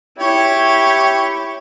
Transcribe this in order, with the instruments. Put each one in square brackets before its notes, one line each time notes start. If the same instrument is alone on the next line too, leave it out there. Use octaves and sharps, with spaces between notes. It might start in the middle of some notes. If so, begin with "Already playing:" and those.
[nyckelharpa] E4 [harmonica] G4 C#5